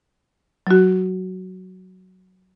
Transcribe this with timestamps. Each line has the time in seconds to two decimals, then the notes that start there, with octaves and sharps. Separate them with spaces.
0.67 F#3 F#4